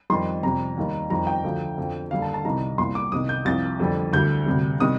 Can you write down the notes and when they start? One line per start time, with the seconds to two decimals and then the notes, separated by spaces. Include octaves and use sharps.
0.10 F2 D#3 G3 C6
0.43 F2 C3 G3 A#5
0.77 D#2 D#3 G3
1.10 F2 D#3 G3 A#5
1.27 G5
1.44 D2 D3 F3
1.78 F2 D3 F3
2.11 D#2 D3 G3 F5
2.22 A5
2.34 A5
2.45 C2 C3 D#3 G3 A#5
2.78 C2 A#2 G3 C6
2.95 D6
3.12 C2 C3 D#3 D#6
3.29 G6
3.45 C2 C3 F3 A6
3.80 F2 D3 G3
4.13 D2 D3 G3 G6
4.46 D2 C3 G3
4.80 C3 D#3 G3 D#6